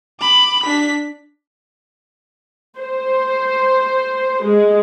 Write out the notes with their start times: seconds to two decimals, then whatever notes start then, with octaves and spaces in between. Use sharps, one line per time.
0.21 B5 D6
0.63 D4 B6
2.79 C5
4.45 G#3